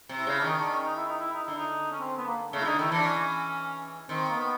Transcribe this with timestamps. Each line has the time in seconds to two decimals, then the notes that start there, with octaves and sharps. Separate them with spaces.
0.09 C3
0.19 E4
0.27 C#3
0.39 D4
0.44 D#3 D#4
0.58 D4
0.70 C#4
0.84 D#4
0.96 E4
1.08 D#4
1.20 E4
1.33 D#4
1.45 D3 E4
1.57 D#4
1.92 C#4
2.00 C4
2.18 B3
2.26 A#3
2.52 C#3 A3
2.60 E4
2.65 D3 D#4
2.79 D#3 E4
2.92 E3 D4
3.04 C#4
4.09 D#3 C4
4.29 A#3
4.35 B3